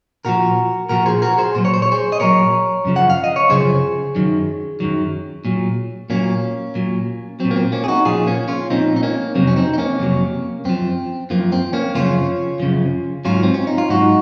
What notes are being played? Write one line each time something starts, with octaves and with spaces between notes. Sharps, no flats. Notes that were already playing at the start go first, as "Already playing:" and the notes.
A#2 F3 F#4 A#4
A#2 F3 F#4 A#4
G#4 C5
F#4 A#4
G#4 C5
A#2 F#3 C5
C#5
C5
C#5
G#4 C5
D#5
A#2 F#3 A#4 C#5
F#2 C#3 F3
F#5
F5
D#5
C#5
F#2 C#3 F3 G#4 C5
F#2 D#3 F#3
F#2 D#3 F#3
A#2 F#3
A#2 F#3 A#3 C#4
A#2 F#3
A#2 F#3 C4
A#3
C4
A#3 C#4
G#4
D#4 F#4
A#2 F3 F4 G#4
A#3 C#4
C#4 F4
A#2 F3 C4 D#4
D#4
A#3 C#4
F2 C3 F#3 C4
C#4
C4 D#4
D#4
A#3 C#4
F2 C3 F#3
F#2 F3 C4
F#2 F3 A#3
C4
A#3 C#4
F#2 C#3 F3 C#4 F4
F#2 C#3 F3
G#2 F#3 C#4 F4
C4
C#4
D#4
F4
G#2 F#3 D#4 F#4